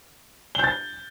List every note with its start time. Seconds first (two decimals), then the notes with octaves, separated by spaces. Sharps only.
0.55 G7
0.59 G6
0.64 A6